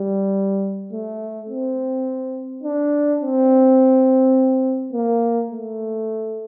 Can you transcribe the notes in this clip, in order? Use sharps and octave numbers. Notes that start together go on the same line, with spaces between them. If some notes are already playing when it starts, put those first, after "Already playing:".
Already playing: G3
A3
C4
D4
C4
A#3
A3